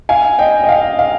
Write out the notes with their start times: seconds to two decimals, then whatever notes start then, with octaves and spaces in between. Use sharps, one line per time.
0.09 F5 G#5
0.39 D#5 G5
0.64 D#5
0.69 F5
0.99 F5